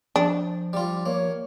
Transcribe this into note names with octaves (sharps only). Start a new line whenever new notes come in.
F3 D4
G3 F4
A#3 C#5